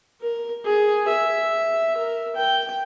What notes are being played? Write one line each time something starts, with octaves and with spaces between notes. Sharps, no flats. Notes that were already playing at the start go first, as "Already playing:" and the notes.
A#4
G#4
E5
A#4
G5